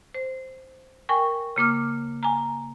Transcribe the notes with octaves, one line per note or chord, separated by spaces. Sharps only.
C5
A#4 G5 G#5 C#6
C#3 A#3 D6 F6
G#5 A#5